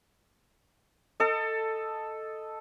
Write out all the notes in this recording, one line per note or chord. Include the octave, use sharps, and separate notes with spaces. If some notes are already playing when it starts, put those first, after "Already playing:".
A4 D#5